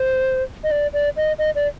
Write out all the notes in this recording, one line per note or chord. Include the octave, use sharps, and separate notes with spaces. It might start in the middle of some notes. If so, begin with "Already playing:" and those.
Already playing: C5
D#5
D5
D5
D#5
D#5
D5